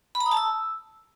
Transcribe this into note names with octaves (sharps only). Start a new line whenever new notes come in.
B5
A#5
D#6
A5
E6